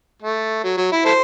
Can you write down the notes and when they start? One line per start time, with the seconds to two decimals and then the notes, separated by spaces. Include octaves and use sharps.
0.22 A3
0.64 F#3
0.78 F#3
0.92 E4
1.06 E4 A4 C5